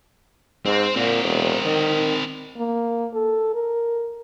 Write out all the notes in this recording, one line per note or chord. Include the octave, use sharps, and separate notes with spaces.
G#2 C4
A#2 C4 A#4
E1
D#3
A#3
A4
A#4